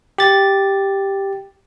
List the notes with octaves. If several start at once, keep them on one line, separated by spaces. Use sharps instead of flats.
G4 A6